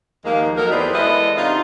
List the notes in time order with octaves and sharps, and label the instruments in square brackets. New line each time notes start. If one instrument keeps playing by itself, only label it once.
[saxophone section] D#2 F3 G#3 A#3
F#3 A#3 D#4 A4 A#4
E2 G4 G#4 B4 C5 D5
E3 G#3 B3 E4 A4 D#5
C3 C4 D4 D#4 F4